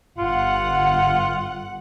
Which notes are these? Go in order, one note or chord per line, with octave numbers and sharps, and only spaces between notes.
G1 F4 F#5